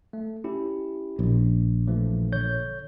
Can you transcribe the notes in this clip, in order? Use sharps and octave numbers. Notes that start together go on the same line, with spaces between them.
A3
C#4 E4 G4
A#1
E3 F3 A3
D3 C#5 G6